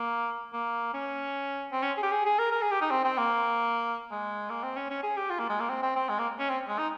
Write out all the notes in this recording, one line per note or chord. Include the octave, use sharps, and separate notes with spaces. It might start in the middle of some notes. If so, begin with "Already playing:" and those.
Already playing: A#3
A#3
C#4
C4
C#4
G#4
G4
G#4
G#4
A#4
A#4
G#4
G4
D#4
C4
C4
A#3
G#3
A#3
C4
C#4
C#4
G#4
G4
F4
A#3
G#3
A#3
C4
C4
C4
G#3
A#3
C#4
C4
G#3
D#4